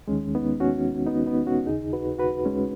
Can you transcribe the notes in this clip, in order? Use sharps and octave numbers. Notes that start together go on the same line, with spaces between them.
D#2 D#3 G#3 C#4
B3 D#4
C#4 F#4
B3 D#4
B3 D#4
C#4 F#4
D#2 C#3 D#4 G#4
F#4 B4
F#4 B4
G#3 C#4